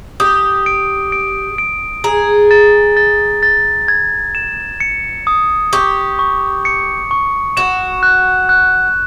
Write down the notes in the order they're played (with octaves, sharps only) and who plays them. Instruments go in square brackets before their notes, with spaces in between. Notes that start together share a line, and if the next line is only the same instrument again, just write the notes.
[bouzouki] G4 [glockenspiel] D#6
[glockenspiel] D7
D7
D7
[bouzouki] G#4 [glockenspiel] A#5
[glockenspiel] A6
A6
A6
G#6
E7
C#7
D#6
[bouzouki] G4 [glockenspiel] C#6
[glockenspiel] C#6
C#7
C#6
[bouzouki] F#4 [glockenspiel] E7
[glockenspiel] F#6
F#6